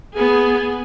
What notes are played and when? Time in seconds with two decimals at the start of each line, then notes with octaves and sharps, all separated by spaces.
0.14 B3 G#4